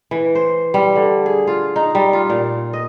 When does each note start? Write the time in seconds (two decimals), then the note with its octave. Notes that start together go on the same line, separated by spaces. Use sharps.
0.11 E3
0.35 C5
0.74 G3
0.95 D3
1.26 G#4
1.47 F4
1.76 D#4
1.95 G3
2.13 F4
2.30 A#2
2.73 D#5